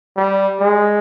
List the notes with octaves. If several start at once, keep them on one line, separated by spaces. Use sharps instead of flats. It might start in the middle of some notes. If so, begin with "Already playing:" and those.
G3
G#3